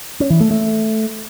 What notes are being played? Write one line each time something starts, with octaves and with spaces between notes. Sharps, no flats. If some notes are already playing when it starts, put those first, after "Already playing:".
C#4
E3
A3
A3